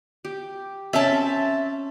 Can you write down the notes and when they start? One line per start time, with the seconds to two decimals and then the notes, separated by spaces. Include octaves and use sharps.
0.25 G4
0.93 C4 C#4 C5 E5 A5